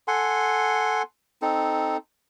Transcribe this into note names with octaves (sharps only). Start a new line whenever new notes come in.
A4 F#5 G#5 C6
C4 D#4 A4